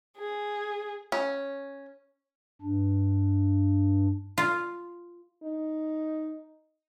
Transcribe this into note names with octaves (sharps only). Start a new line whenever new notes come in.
G#4
C#4
G2 D4
F4
D#4